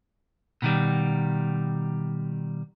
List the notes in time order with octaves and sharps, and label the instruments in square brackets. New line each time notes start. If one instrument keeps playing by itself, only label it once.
[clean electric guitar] B2 D#3 G3